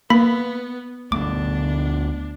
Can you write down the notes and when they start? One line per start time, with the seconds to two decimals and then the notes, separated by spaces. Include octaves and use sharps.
0.10 A#3 B3 B5 B6
1.12 D2 A3 B3 D4 D6